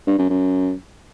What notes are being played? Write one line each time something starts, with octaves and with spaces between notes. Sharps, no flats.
G2
F#2
F#2